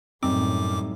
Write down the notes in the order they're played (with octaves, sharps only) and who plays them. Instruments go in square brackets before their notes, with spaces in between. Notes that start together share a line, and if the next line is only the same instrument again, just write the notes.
[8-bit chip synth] F#2 D6 [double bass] A2 [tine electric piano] F#3 G3 D#4 [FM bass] C4